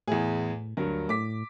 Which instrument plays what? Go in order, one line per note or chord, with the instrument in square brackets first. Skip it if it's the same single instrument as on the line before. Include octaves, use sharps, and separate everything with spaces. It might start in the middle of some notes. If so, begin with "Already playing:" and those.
[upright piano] E2 E4 G#4 [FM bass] A2
[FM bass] D2 [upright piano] G2 F#3 A#4
[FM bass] A2 [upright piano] D6 B6